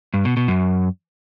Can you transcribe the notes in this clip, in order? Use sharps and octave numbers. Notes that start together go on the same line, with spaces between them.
G2
B2
B2
F#2